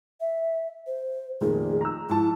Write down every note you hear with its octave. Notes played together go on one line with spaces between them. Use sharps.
E5
C5
F1 A#2 D#3 G#4
A#5 E6
G#2 F3 E4 A5